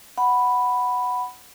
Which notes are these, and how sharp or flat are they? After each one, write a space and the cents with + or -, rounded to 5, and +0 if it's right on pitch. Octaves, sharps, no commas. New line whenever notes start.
F#5 +0 B5 +0